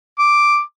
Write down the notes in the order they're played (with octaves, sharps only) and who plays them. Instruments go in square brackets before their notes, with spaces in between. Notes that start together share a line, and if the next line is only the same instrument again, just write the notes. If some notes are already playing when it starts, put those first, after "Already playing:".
[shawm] D6